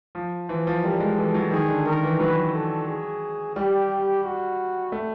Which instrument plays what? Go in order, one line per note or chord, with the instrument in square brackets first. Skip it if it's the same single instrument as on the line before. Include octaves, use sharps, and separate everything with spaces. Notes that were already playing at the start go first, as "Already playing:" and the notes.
[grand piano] F3
[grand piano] E3 [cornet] C5
[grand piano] F3
[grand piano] G3 [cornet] A#4
[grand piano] G#3
[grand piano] E3 [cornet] A4
[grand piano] F#3
[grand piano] D#3 [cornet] G#4
[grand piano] D3
[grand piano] D#3 [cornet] A#4
[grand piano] E3
[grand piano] F#3 [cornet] B4
[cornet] A4
G#4
[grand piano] G3 [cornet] G4
[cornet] F#4
[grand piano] A3